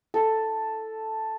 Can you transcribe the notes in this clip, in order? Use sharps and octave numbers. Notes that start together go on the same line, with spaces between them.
A4